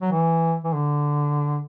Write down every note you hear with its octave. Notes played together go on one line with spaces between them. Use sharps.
F#3
E3
E3
D3